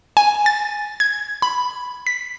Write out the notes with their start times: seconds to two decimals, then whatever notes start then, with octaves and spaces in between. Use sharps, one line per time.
0.17 G#5
0.46 A6
1.00 G#6
1.42 B5
2.07 B6